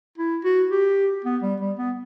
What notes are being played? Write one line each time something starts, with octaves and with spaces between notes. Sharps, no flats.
E4
F#4
G4
B3
G3
G3
B3